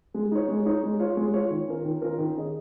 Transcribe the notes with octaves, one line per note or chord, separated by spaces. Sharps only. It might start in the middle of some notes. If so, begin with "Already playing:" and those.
G#3
D#4 C#5
G#3
D#4 C#5
G#3
F4 C#5
G#3
F4 C#5
D#3
C#4 F4 A#4
D#3
C#4 F4 A#4
D#3
C#4 G#4 D#5